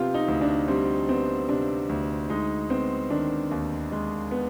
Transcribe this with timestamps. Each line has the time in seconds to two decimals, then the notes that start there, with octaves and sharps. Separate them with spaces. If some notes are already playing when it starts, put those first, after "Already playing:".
Already playing: C3 B3 F4 G4
0.14 D#4
0.28 D2
0.41 D4
0.68 G3 C4
1.08 B3 C4
1.49 C3 D4
1.89 D2
2.30 G#3 D#4
2.70 B3 C4
3.10 D#3 D4
3.51 D#2
3.92 G#3
4.31 B3